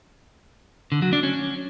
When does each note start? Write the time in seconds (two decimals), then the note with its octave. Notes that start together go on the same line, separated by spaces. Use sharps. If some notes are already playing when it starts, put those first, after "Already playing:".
0.92 D3
1.02 F#3
1.13 D4
1.23 C#4